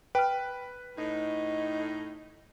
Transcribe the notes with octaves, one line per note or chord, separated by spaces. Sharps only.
B4 G5 F6
A2 D#4